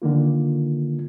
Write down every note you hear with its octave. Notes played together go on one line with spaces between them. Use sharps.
D3 D#3 A#3 F4